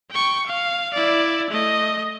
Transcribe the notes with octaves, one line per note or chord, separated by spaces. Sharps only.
G5 C#6
F5
E4 D5
A3 D#5